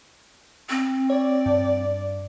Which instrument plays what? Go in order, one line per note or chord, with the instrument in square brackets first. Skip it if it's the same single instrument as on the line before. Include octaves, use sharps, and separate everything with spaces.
[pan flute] C4
[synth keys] C#5 [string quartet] D5
[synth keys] G2